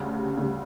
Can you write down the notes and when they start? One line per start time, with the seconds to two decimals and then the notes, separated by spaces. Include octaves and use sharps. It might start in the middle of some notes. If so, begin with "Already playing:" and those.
Already playing: D2 C#3 G3
0.37 D2 C#3 G3